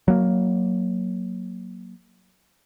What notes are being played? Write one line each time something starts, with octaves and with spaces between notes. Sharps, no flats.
F#3 A#3